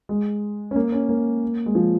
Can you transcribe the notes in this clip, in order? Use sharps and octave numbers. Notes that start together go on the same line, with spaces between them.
G#3
C#4
A#3
C#4
A#3
G#3
F3